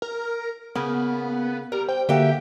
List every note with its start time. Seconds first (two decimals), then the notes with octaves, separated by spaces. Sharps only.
0.02 A#4
0.75 C#3 A#3 B3
1.72 G3 A#4
1.88 C5 G5
2.09 D3 A#3 F#4 G4 E5 G5